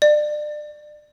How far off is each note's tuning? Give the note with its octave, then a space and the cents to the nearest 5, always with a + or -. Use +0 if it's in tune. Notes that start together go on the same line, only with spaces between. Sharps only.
D5 +30